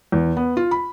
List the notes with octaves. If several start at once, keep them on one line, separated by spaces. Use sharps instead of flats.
E2
B3
F4
B5